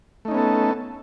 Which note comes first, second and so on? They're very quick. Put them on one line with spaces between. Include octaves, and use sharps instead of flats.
A3 D#4 C#4 B3 A4